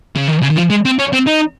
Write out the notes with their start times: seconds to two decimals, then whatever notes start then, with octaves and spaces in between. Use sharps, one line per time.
0.15 C#3
0.27 D#3
0.42 C#3
0.50 D#3
0.57 F3
0.70 G#3
0.85 C4
0.99 C#4
1.13 C4
1.27 D#4